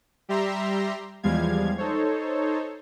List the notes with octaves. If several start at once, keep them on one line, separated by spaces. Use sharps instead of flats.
G3 G4 E5 A#5 C6
E2 F3 G3 G#3 F5 G#6
D#4 A4 C5 C#5